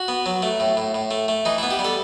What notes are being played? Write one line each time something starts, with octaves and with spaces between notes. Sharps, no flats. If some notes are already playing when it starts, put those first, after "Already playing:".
Already playing: F#4
B3
F#3
A3
A2
A2
A2
A3
A3
E3 D#4
E4
B3
G4
G3
A4